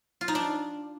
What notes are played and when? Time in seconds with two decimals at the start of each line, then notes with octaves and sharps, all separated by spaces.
0.21 F4
0.28 D#4
0.35 D4